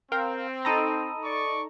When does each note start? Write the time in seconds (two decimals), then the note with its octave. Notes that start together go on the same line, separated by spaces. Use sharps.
0.12 C4 A#4 F5 G5
0.65 D#4 A4 A#5 B5 D#6 D#7
1.23 D5 C#6